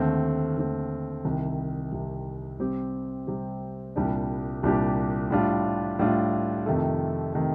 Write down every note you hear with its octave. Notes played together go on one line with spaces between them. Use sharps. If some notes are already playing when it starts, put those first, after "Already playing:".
Already playing: D#2 D3 A3 C4
D#2 D3 A3 C4
C2 C3 D#3
C2 C3 D#3
C3 G3 C4 G4
C3 G3 C4 G4
C2 A#2 G3 D4 G4
C2 A#2 G3 D4 G4
A2 G3 D4 F4
A2 G3 D4 F4
F2 C3 D#3 A3
C3 D#3 A3